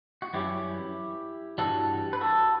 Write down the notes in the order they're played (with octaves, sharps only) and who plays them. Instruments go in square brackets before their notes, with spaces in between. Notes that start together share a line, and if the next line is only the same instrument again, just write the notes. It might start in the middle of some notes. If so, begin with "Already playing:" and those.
[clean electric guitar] F#4
F#2 E3 G3 C#4 E4 G4
G2 E3 G3 F#4 A4
B4
F#4 A4